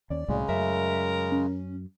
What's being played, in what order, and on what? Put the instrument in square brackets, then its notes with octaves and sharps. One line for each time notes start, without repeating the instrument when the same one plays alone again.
[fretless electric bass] D#2 C#4 [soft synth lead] D5
[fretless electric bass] C2 A2 F#3 [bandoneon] C#3 G#3
[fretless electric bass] F#2 A3 [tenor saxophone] A#4 [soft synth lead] E5
[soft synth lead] C#4